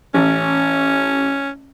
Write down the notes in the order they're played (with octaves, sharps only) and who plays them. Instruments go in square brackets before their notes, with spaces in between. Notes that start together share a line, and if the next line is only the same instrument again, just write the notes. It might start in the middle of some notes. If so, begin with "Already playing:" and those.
[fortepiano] A1 [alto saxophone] C#4